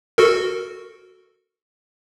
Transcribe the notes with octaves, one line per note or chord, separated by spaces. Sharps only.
F#4 A4 A#4